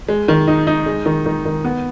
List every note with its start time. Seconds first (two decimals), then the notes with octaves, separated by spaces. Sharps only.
0.08 G#3
0.28 D#3
0.48 D#4
0.67 D#4
0.86 G#3
1.06 D#3
1.26 D#3
1.45 D#3
1.65 B3